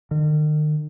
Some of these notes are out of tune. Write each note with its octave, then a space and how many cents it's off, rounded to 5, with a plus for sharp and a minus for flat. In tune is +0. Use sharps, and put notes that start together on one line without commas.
D#3 -40